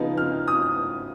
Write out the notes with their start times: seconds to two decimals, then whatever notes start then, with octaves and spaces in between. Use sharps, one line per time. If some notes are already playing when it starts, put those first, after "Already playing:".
Already playing: C#3 F3 B3 D#4
0.17 F6
0.48 D#6